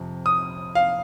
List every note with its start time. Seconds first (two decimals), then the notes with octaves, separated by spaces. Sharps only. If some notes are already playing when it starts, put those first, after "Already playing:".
Already playing: F2 C3
0.26 D#6
0.75 F5